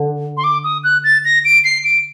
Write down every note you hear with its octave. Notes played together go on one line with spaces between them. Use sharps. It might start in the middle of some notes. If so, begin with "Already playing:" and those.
Already playing: D3
C6
D6
D#6
F#6
A6
A#6
D7
C7
D7